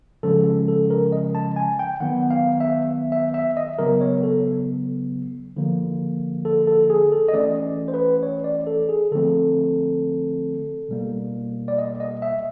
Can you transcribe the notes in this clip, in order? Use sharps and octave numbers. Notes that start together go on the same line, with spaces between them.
C#3 F3 G#3 C#4 A4
A4
A#4
D#5
A5
G#5
G5
D#3 F#3 B3 F#5
F5
E5
E5
E5
D#5
C#3 F#3 B3 A#4
C#5
A4
D3 F3 A#3
A4
A4
G#4
A4
D#5
E3 A3 C#4 D5
C5
B4
C#5
D5
A4
G#4
D3 F3 A3 C4 A4
B2 G3 A#3
D5
D#5
D#5
E5